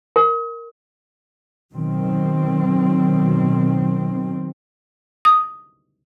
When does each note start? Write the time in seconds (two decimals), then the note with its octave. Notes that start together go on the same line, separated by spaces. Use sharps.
0.16 A#4
1.74 B2 D#3 F#3 C4
5.25 D#6